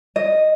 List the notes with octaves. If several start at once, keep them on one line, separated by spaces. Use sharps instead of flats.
D#5